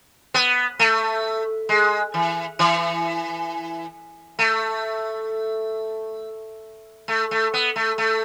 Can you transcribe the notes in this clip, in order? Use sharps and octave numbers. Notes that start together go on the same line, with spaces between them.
B3
A3
G#3
E3
E3
A3
A3
A3
B3
A3
A3